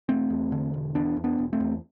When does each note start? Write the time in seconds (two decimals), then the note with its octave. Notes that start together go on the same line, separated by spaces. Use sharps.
0.09 E1 A3 C4
0.30 E2
0.52 D3
0.74 E1
0.95 E2 B3 D4
1.17 E2
1.24 B3 D4
1.38 E1
1.53 A3 C4
1.60 E2